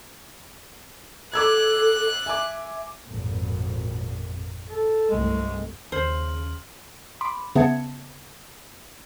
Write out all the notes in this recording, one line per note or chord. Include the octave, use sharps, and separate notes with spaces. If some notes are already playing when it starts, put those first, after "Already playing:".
A4 D6 E6 F#6 G#6
E5 G#5 D6
G#1 F2 A#2
A4
C2 G2 G#3 A3
D#2 C#3 C5 C6 F6 F#7
B5 C6 D6
C#3 B3 E5 A5 G#6 C#7